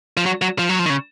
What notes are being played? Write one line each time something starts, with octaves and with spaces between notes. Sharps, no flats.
F3
F#3
F#3
F3
F#3
F3
D#3
C#3